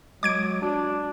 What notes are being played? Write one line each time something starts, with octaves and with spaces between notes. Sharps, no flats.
F#3 G#3 D6 G#6 D7
D4 F#4